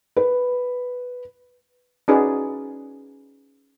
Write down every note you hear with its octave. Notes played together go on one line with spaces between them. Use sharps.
B4
C#4 D#4 F#4 G#4 B4 D5